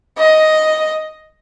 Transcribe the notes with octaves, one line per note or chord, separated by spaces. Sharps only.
D#5